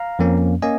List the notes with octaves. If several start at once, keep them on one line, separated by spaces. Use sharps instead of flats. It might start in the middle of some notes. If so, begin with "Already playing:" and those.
Already playing: F5 A#5
F2 F3 A#3 C#4
A#3 C#4 D#5 G#5